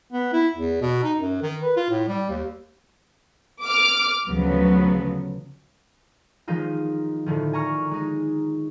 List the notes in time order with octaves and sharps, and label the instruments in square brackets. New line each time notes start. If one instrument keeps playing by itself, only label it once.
[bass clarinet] B3
E4
E2
B2
D#4
F#2
D#3
B4
F4
A2
G3
D#2
[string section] D6 F6
D2 C#3 F3 F#3 B3
[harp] D#3 F3 G#3 D#4 F4
A2 D3 D#3 F3
G#5 A#5 C#6 F6
G#3 D#4